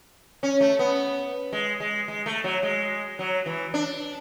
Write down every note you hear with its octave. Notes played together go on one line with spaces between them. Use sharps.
C#4
A3
B3
G#3
G#3
G#3
A3
F#3
G#3
F#3
E3
D4